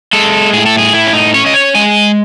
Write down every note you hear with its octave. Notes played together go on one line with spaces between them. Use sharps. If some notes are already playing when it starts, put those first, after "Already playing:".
G#3 A4
A2 G#4
A4
G#4
A2 E4
C#4
D#4
C#4 C#5
D#5
C#5
G#3 G#5